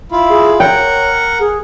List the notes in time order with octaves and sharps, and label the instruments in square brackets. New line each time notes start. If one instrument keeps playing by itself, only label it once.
[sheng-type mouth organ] E4 F4
[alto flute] G#4
[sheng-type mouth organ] A#4 F#5 [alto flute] C#5 [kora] G5
[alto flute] G#4